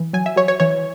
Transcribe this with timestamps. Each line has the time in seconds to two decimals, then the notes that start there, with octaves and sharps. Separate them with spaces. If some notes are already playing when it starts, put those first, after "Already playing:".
Already playing: E3
0.13 F#3 G#5
0.26 E5
0.36 F#3 C#5
0.48 C#5
0.60 E3 C#5